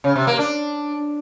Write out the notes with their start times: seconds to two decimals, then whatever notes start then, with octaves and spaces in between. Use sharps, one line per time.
0.04 C#3
0.16 C3
0.27 A#3
0.39 D4